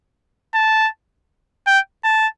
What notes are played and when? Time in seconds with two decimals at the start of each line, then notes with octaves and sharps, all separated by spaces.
0.54 A5
1.67 G5
2.04 A5